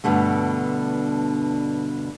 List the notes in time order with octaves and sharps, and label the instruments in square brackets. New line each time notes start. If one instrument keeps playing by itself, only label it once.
[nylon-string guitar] G2 B2 D3 A3